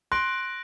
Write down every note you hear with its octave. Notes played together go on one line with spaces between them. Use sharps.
C6 F#6 A#6 D7 F#7